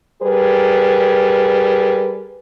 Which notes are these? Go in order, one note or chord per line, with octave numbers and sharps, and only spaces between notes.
G3 G#4 A#4 B4